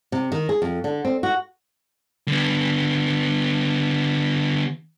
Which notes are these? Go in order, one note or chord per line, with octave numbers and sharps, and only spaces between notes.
C3
D#3
G#4
F2
D3
C4
F#4
D3 B3